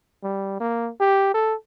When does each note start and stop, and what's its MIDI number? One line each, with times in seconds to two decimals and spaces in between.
0.23 0.55 55
0.60 0.90 58
1.00 1.33 67
1.34 1.54 69